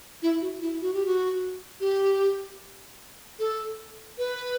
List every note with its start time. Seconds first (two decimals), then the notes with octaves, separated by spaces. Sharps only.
0.22 E4
0.41 F#4
0.62 E4
0.81 F#4
0.94 G4
1.05 F#4
1.80 G4
3.39 A4
4.18 B4